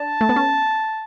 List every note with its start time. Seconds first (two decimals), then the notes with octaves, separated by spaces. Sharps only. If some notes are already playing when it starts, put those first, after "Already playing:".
Already playing: D4 A5
0.21 A3
0.29 B3
0.36 C#4